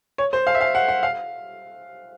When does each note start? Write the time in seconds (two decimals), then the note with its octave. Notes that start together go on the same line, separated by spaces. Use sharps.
0.18 C#5
0.33 C5
0.47 F5
0.55 E5
0.61 F5
0.75 F#5
0.88 F#5
1.03 F5